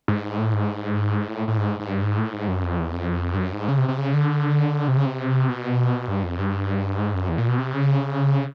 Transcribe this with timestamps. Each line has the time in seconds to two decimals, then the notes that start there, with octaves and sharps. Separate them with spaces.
0.08 G#2
0.38 A2
0.53 G#2
1.28 A2
1.48 A2
1.57 G#2
1.80 G#2
1.88 G2
2.03 G#2
2.18 A2
2.33 G#2
2.48 F#2
2.63 F2
2.79 E2
2.93 F2
3.34 G2
3.38 F#2
3.53 G#2
3.68 C#3
3.78 C3
3.88 C3
3.98 C#3
4.14 D3
4.88 C3
4.97 C#3
5.06 C3
5.49 B2
6.08 G2
6.23 F2
6.39 G2
6.99 G#2
7.13 F#2
7.29 E2
7.38 A#2
7.48 B2
7.58 C3
7.73 C#3